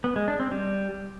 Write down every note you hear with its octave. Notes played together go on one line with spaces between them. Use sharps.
B3
G#3
D4
C4
G3